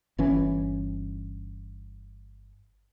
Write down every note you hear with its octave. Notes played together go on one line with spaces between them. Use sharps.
G1 E3 C#4